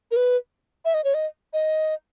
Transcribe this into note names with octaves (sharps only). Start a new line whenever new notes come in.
A#4
B4
E5
D#5
C#5
D#5
D#5